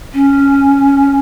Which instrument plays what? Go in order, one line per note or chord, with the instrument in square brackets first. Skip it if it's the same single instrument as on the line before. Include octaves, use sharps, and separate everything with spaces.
[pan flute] C#4